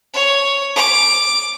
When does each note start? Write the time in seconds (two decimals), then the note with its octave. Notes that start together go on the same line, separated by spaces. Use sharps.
0.14 C#5
0.76 D6